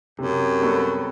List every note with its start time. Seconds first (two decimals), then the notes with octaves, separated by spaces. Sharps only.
0.19 F#2 C3
0.60 G3 B3 F#4 A4